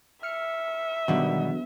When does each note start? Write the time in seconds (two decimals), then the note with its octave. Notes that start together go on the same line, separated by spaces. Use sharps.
0.23 E5 F6 C#7
1.08 E2 B2 D3 D#3 F#3 G3